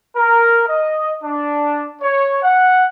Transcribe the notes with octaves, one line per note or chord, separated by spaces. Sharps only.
A#4
D#5
D4
C#5
F#5